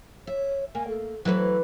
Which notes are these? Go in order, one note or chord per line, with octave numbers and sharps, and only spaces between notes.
C#5 E5
A#3 G#5
A4
E3 F#3 A3 E4 B4 C5